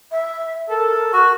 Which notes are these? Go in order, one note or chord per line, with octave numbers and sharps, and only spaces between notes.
E5
A4 A#4
F#4 C#6